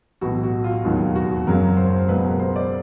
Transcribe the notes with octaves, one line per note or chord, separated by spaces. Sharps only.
B1 A2 E3 F#4
F#4
F4
E1 D#2 D#3 F#3 F4
F#4
F#1 F#2 C#3 F#3 A#4
C5
C#2 B2 F#3 B4
A#4
C5
D5